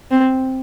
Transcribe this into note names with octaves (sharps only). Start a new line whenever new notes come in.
C4